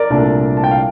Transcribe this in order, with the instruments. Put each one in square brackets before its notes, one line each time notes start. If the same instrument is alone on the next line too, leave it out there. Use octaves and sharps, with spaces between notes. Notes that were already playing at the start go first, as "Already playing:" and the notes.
Already playing: [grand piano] A#4 D5
C2 A#2 A3 D4
A5
G5
F5